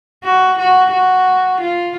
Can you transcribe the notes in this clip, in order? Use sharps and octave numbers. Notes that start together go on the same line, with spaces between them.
F#4
F#4
F#4
F4